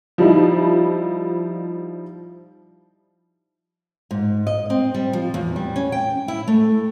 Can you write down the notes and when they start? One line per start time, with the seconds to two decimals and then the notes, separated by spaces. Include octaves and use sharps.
0.18 F3 G3 D#4 E4
4.11 G#2
4.47 D#5
4.70 C4
4.94 G3
5.13 F3
5.34 E2
5.56 G3
5.76 C#4
5.92 G5
6.28 E4
6.47 A3